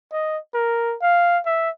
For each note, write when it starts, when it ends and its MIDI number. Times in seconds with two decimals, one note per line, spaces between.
0.12 0.38 75
0.54 0.95 70
1.01 1.39 77
1.46 1.70 76